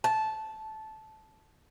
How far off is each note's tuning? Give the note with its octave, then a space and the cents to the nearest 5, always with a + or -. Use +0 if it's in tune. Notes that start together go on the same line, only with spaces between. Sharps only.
A5 -10